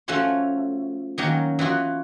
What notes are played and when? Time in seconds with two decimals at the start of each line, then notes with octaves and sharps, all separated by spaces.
0.08 F3 A3 C#4 F4 F#4 C#5
1.18 D#3 F#3 A#3 C#4
1.59 E3 B3 F4 F#4